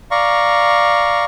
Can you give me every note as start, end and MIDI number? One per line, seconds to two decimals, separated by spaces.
0.11 1.25 74
0.11 1.25 77
0.11 1.25 82
0.11 1.25 85